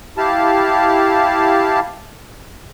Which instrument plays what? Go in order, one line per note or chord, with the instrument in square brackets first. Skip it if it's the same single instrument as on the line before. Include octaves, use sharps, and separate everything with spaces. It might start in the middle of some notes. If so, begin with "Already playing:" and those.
[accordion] E4 G4 F5 A5